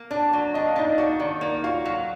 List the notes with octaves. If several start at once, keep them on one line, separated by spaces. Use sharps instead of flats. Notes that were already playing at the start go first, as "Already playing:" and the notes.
Already playing: A#3
D4 D5
F#3
D4 D#5
F5
D4 D#4 D#5
F#4 D5
D#3 D5
A#3 D5
F4 F#4 F5
F#3